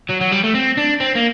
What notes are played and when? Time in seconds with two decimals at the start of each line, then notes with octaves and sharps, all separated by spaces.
0.09 F#3
0.21 F#3
0.32 G3
0.43 A3
0.54 C4
0.77 D4
1.00 C4
1.16 A#3